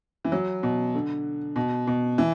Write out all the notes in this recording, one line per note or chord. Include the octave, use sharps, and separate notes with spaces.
E3
F#3
B2
D3
B2
B2
E3